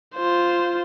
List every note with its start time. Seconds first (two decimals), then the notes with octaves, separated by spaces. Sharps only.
0.15 F4 C5